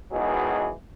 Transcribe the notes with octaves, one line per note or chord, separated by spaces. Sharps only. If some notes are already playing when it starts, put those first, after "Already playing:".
G#2 B2 D#3 E3 F#3 G#4